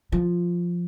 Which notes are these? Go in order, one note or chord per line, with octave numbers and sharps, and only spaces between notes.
F3